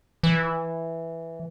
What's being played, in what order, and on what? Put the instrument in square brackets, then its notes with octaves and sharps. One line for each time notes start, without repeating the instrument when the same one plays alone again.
[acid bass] E3